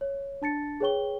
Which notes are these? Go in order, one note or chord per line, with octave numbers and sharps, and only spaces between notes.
C#5
D4 A5 A6 C#7
G#4 B4 C#5 G5 C#6 G7